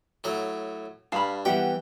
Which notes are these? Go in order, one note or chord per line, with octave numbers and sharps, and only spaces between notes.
A2 F#3 A#5
G2 F5 A5 B5
E3 G3 B3 G4 E5 F#5 G5